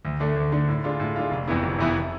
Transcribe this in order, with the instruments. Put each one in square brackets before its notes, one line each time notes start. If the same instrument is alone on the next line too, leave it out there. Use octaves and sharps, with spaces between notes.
[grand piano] D2
D3 A3 D4
D2
D3 A3 D4
A2
G#3 D4 F4
A2
G#3 D4 F4
F1
F2 E3 B3 E4
F1
F2 E3 B3 E4